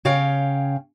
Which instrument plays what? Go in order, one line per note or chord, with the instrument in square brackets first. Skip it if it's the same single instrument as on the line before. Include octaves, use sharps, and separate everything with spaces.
[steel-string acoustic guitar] C#3 C#5 F5 G5